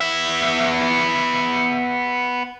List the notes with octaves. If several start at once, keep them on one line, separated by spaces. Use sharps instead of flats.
B3 E5